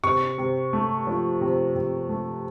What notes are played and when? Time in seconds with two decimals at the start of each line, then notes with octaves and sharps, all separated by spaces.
0.03 C3 C#6
0.38 C3
0.73 A3
1.07 F3
1.41 C3
1.75 C3
2.09 A3